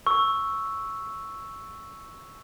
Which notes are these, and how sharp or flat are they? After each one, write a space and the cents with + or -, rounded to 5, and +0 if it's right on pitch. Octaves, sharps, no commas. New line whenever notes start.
C#6 +0 E6 +0